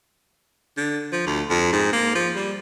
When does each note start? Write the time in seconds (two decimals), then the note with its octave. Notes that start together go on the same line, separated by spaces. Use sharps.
0.77 D3
1.13 F3
1.27 D2
1.50 F2
1.72 G#2
1.93 A#3
2.15 F3
2.36 G3